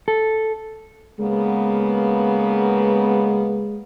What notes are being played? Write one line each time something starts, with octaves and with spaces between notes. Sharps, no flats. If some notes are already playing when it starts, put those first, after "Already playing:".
A4
C#3 G#3 A#3 B3